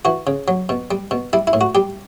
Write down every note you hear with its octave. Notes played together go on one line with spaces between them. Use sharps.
E3 F#4
C#3
F#3
B2
G3
B2
G3 E4
E4
A2
F#4
G3 G4